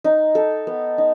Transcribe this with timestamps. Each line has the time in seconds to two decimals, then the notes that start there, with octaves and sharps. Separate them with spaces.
0.04 D#4
0.35 A4
0.67 B3
0.98 D#4